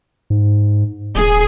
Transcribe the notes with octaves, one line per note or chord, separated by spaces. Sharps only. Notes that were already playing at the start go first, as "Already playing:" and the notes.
G#2
D#1 G#4